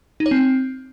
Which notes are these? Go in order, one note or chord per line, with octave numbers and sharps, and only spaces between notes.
D#4
C#5
C4